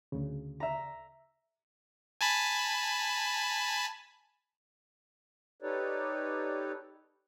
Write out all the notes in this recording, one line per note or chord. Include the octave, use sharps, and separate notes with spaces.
D2 C#3
E5 A#5
G#5 A5 B5
D#4 G4 A4 B4 C#5 D5